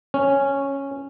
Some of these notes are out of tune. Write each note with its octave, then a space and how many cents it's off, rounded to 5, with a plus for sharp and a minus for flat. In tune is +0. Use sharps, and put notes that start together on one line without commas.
C#4 -5